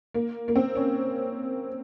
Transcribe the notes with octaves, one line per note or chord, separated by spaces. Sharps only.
A#3
A#3
C4
C#4